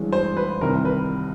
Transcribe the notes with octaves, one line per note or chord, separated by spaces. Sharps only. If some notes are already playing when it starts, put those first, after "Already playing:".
Already playing: A1 G2 E3 G#3
C5
B4
C2 C3 D#3 G3 A#4
B4